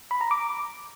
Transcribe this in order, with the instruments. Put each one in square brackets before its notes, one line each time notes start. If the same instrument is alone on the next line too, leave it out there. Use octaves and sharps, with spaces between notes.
[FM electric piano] B5
A#5
D6